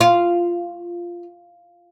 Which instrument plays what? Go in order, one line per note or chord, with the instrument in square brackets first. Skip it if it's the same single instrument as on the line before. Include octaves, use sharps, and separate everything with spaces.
[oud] F4